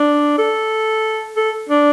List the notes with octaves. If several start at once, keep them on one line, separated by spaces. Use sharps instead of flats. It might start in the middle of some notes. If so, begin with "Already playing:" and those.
Already playing: D4
A4
A4
D4